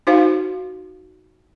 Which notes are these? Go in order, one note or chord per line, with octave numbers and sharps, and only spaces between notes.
D#4 F#4 C5 F5